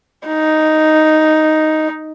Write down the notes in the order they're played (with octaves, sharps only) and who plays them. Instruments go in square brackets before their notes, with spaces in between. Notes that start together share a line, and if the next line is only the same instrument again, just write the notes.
[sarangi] D#4